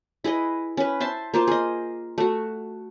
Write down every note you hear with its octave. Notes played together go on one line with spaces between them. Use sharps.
E4 G#4 B4 D#5
C#4 B4
C5 E5 A5 C6
A#3 F4 C5
G#4 D#5
A3 F#4